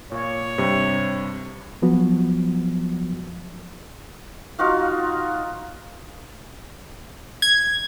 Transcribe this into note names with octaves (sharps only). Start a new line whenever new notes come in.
A#2 C#5 F5
G2 C3 G3
F3 F#3 B3 F#4
D#4 F4 F#4 F5
G#6